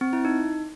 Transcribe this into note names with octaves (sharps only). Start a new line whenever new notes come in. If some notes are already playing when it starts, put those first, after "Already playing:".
C4
E4
D#4